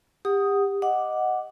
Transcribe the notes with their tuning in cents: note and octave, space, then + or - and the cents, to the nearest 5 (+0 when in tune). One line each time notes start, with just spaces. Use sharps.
G4 +30 F#5 +10 D#6 +0
D#5 +0 F#5 +0 D6 +0